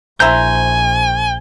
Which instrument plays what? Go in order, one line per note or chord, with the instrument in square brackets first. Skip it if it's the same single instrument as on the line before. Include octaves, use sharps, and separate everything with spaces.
[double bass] A#1 [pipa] E4 C5 A#5 [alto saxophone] G#5 [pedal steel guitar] G6